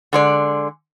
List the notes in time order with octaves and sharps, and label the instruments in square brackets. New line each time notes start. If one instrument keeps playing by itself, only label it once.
[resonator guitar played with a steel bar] D3 G#3 D5